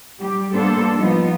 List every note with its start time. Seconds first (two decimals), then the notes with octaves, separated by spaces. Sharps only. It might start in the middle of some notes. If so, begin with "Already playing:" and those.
0.20 G3 G4
0.54 G3 A#3 B3 D4 A4 C5
0.96 F3 G3 B3 D#4 F4